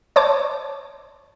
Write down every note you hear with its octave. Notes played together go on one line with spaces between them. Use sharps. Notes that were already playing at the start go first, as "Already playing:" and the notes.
C5 C#5 A5 D6